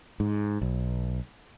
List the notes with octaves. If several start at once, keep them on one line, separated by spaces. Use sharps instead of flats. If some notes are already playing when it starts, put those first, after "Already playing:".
G#2
B1